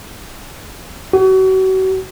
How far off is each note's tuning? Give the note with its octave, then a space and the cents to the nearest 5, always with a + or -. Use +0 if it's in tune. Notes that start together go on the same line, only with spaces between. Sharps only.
F#4 +35